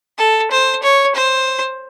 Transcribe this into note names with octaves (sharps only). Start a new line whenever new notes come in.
A4
C5
C#5
C5